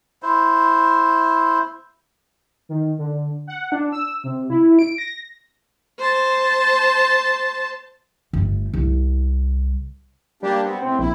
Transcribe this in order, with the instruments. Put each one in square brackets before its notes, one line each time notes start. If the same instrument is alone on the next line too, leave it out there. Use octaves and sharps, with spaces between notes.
[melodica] E4 C5
[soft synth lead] D#3
D3
F#5
D4
E6
C3
E4
D7
A#6
[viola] C5 A5
[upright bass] G1 A3
C2
[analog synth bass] G3 [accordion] A#3 D4 G4
[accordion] B3 C4
[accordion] A2 C3 [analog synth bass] C4
[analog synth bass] A#1 [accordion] E4